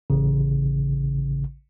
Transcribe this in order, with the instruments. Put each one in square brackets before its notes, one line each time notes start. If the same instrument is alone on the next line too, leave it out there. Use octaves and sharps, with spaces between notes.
[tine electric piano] A1 C#3